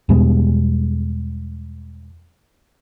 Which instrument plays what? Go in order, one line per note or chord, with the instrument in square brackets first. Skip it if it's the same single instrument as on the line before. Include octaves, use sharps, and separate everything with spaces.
[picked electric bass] E2 B2 G3 G#3